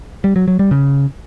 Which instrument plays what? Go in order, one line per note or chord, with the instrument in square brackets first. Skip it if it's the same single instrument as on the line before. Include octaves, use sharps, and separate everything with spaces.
[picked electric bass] G3
F#3
F#3
G3
C#3